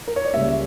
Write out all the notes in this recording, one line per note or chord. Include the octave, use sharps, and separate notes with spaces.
A#4
C#5
D5
C#2 C#3 G3 A#3 E5